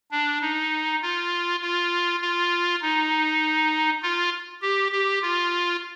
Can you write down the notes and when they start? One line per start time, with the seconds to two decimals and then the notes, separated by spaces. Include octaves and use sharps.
0.11 D4
0.41 D#4
1.02 F4
1.61 F4
2.21 F4
2.82 D#4
4.02 F4
4.62 G4
4.92 G4
5.22 F4